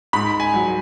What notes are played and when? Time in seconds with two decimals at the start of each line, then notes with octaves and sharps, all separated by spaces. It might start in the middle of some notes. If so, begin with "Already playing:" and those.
0.13 G#2 B5
0.40 G#5
0.54 F#3